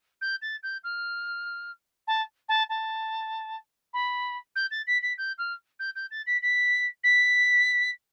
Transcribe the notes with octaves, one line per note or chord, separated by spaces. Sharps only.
G6
A6
G6
F6
A5
A5
A5
B5
G6
A6
B6
B6
G6
F6
G6
G6
A6
B6
B6
B6